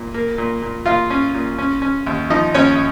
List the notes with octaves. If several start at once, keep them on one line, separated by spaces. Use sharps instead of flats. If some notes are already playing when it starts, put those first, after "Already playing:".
Already playing: A#2
A#3
A#2
A#2
A#2 F4 F5
C#4
A#2
C#4
C#4
D#2
F3 D#4 D#5
D#2 C#4 C#5